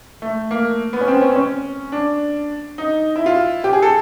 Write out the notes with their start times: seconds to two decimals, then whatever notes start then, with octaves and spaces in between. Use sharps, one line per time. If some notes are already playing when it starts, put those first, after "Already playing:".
0.22 A3
0.51 A#3
0.93 B3
1.01 C#4
1.08 C4
1.21 C#4
1.32 C4
1.35 C#4
1.92 D4
2.78 D#4
3.16 E4
3.26 F4
3.64 G4
3.73 G#4
3.82 A4